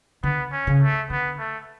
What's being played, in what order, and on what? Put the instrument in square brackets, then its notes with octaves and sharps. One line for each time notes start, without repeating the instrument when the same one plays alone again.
[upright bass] D3 [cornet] B3
[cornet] C#4
[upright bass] C#3
[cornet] A3
[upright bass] D3 [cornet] B3
[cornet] A3